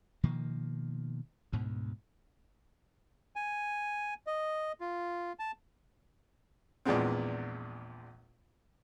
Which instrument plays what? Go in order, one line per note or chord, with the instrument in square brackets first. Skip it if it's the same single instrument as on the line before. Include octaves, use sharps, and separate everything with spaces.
[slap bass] B2 D#3 F3 A#3
D2 G#2 B2
[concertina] G#5
D#5
F4
A5
[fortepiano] A#1 E2 A#2 G#3 B3 C4